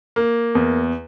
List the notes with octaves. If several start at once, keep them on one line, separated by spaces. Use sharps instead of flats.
A#3
E2